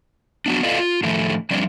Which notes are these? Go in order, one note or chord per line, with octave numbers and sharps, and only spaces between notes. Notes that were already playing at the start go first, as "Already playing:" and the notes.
F#3 B3 D4
F4 A4 B4 D5 D#5 F5
F4
A2 D3 D#3 F3 A3
F3 G3 C4 D4 D5